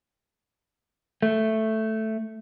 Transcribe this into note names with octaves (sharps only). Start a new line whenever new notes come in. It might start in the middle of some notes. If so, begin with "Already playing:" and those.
A3